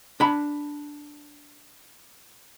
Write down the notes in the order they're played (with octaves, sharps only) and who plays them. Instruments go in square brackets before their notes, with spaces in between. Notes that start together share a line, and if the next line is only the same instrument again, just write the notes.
[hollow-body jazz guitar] D4 B5